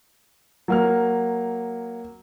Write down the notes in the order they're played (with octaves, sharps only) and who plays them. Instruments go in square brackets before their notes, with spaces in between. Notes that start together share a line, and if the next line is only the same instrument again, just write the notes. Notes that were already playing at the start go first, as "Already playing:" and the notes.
[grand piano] F#3 A#3 F6